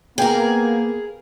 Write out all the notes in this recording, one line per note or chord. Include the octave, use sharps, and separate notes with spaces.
A#3 B3 G#4 A#4 G5